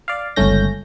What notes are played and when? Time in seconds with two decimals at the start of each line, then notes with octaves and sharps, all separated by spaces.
0.08 D5 F5
0.36 G1 C#2 A3 C#4 G6 A#6